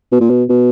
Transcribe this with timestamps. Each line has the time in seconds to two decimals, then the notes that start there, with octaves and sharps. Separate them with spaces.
0.12 B2
0.20 A#2
0.30 B2
0.49 B2